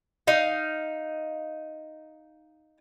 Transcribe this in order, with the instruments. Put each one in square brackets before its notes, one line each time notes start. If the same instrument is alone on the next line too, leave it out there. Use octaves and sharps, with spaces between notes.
[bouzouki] D#4 F5